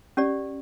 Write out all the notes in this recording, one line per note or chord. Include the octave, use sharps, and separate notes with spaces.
C#4 G4 D5